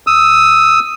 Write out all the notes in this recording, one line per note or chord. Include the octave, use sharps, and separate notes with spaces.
D#6 E6